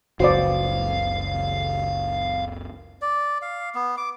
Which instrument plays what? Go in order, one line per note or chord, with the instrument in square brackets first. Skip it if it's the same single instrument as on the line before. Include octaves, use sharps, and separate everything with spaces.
[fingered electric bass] F#1 C#2 [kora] F3 B3 C4 [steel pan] F#4 D5 [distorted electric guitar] F5
[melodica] D5
F5
B3
D6